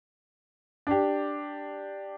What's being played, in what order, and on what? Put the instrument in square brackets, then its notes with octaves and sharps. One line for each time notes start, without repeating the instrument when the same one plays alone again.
[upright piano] D4 G4